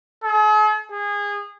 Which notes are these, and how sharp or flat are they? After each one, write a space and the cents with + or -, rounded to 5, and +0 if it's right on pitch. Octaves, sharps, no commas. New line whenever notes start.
G#4 +45
G#4 -25